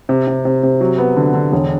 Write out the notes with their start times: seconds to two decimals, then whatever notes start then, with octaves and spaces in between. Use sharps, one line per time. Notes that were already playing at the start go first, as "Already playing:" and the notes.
0.09 C3
0.27 C3
0.45 C3
0.63 C3
0.81 F#3
0.98 B3
1.16 D3
1.34 D3
1.53 E1